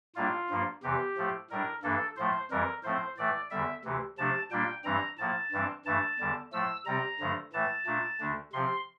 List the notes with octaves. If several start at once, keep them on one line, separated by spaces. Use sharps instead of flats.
A2 G3 A#3 D4 F4
G2 F3 A#3
E2 C3 E3 G4
A2 F3 A3
A2 G3 D4 A#4
G2 E3 A#3 D4 A4
A2 F3 A3 C5
F2 E3 G3 A#4
A2 F3 A3 C4 C5
A2 E3 A3 D5
E2 D3 G3 E5
D2 C3 E3
C3 F3 A3 D4 A5
A#2 G3 A#3 D4 G5
G2 E3 G3 C4 A#5
A2 F3 A#3 A5
G2 E3 G3 C4
G2 E3 A3 A5
E2 D3 G3
A2 F3 A3 E6
C3 G3 C4 A#5
G2 D3 F3 A3
A2 E3 A3 A5
A#2 A3 D4
D2 D3 A3 D4
C3 F3 C4 C6